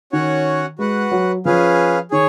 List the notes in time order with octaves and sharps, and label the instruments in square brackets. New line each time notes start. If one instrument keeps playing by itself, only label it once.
[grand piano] D#3 [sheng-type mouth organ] C#4 F#4 C#5 F#5
[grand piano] G#3 [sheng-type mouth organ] F#4 B4 F#5
[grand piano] F#3
[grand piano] F3 [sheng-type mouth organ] C#4 G#4 B4 F5
[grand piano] D#3 [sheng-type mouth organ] G#4 C#5